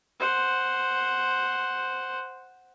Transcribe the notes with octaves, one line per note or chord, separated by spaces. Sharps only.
C5 F#5